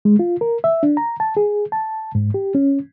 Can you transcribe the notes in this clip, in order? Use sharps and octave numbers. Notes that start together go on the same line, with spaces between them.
G#3
F4
A#4
E5
D4
A#5
A5
G#4
A5
G#2
G4
C#4